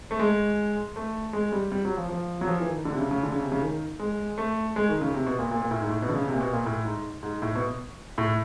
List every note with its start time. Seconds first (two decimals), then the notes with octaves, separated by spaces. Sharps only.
0.11 A3
0.20 G#3
0.96 A3
1.33 G#3
1.52 G3
1.72 G3
1.85 F#3
1.97 F3
2.09 F3
2.41 F#3
2.47 F3
2.60 E3
2.66 D#3
2.85 D3
2.92 C3
2.98 C#3
3.11 C#3
3.23 D3
3.32 C#3
3.42 C3
3.52 C#3
3.62 D#3
4.00 G#3
4.38 A3
4.76 G#3
4.89 D#3
5.01 C#3
5.14 C3
5.26 B2
5.39 A#2
5.51 A#2
5.62 A#2
5.71 A2
5.81 G#2
5.89 A2
6.02 B2
6.09 D3
6.15 C#3
6.28 C3
6.34 A#2
6.40 B2
6.53 A#2
6.66 A2
6.85 G#2
7.23 G#2
7.42 A2
7.55 B2
8.18 A2